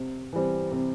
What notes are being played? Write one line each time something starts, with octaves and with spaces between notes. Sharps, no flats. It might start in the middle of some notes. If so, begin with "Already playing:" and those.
Already playing: C3
E3 G3 C4
C3